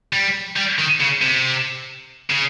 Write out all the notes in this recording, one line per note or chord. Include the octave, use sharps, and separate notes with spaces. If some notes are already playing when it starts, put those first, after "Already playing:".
G3
G3
D#3
C#3
C3
C#3